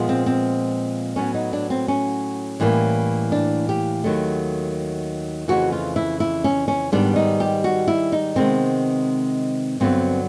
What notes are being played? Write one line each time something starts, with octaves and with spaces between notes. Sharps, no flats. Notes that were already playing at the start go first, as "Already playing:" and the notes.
Already playing: A#2 F3 G#3 B3
C4
C4
A2 F#3 B3 C#4
D#4
D4
C4
C#4
A2 E3 G3 A#3
D4
G4
D#2 D#3 F#3 A3
F2 C#3 E3 A3 F#4
F4
E4
E4
C#4
C#4
G#2 D#3 G3 B3 D4
D#4
G4
F#4
E4
D#4
C3 D#3 G#3 B3 C4
G2 D3 F#3 B3 C4